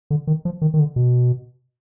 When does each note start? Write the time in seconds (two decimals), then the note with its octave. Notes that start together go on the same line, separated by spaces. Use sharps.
0.10 D3
0.27 D#3
0.45 F3
0.62 D#3
0.74 D#3
0.79 D3
0.96 B2